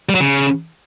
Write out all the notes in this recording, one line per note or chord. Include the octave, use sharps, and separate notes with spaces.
G3
F#3
C#3